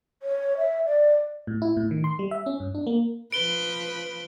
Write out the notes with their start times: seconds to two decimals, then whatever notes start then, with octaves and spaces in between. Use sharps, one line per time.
0.23 C#5
0.57 E5
0.86 D5
1.47 A2
1.62 E4
1.77 A2
1.91 D#3
2.04 C6
2.19 G3
2.31 E5
2.46 C#4
2.60 G2
2.75 D4
2.87 A#3
3.32 F3 B4 D7 G7